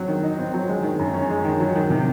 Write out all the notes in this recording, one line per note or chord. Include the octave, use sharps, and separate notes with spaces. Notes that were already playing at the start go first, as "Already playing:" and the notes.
Already playing: F#3 C4
D#3
D#4
C4
F#3
G#3
D#3
F#2
C#4
G#3
D#3
F#3
D#3
C3